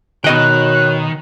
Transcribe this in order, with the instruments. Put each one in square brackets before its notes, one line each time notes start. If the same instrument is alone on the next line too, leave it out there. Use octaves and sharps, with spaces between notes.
[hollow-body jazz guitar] B2 D#5 G5 [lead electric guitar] D#3 [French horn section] F#4 C#5 [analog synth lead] F#6